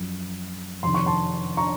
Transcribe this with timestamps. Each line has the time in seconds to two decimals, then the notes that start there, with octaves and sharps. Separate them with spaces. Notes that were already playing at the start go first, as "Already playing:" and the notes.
Already playing: F#2 F3
0.83 F2 C3 D#3 C6
0.94 C#6
1.06 A5 C6
1.57 A#5 C#6